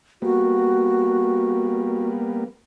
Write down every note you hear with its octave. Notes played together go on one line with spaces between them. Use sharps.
G3 A#3 B3 F#4